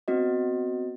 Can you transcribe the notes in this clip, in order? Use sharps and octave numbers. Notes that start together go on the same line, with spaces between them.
B3 C4 F#4 D#5